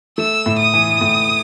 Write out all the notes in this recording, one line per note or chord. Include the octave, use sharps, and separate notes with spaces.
A3 E6
A2
D#6
E3
A2